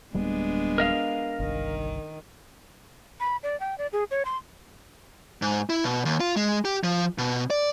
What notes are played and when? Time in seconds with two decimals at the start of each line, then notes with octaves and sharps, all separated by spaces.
0.14 D1 G3 G#3 A#3 B3 D4
0.78 A#4 D#5 F5
1.40 G1 C2 D#3
3.20 B5
3.43 D5
3.60 G5
3.78 D5
3.93 G#4
4.11 C#5
4.25 C6
5.42 G#2
5.70 E4
5.84 B2
6.05 D#2
6.20 F4
6.36 G#3
6.65 G4
6.84 F3
7.18 B2
7.50 D5